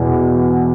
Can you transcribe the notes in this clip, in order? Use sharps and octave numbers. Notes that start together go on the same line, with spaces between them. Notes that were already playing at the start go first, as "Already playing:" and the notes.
Already playing: E2 B2